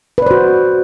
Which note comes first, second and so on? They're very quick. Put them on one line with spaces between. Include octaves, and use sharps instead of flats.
B4 D5 C5 F#4